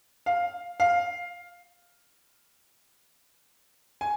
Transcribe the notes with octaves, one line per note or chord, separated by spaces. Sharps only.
F5
F5
G#5